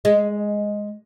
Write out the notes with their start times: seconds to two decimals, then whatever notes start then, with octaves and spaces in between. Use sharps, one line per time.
0.05 G#3